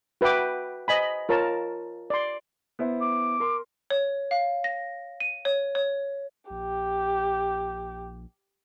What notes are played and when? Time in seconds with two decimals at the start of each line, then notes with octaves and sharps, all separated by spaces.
0.21 F#4 B4 E5 G5 D6
0.88 C5 D#5 G#5 B5
1.29 F4 A#4 C#5 A5
2.10 D5 C6
2.79 B3 E4 C5
3.00 D6
3.40 A#4 C6
3.90 C#5
4.31 F5
4.64 A#6
5.20 D#7
5.45 C#5
5.75 C#5
6.50 A#1 G4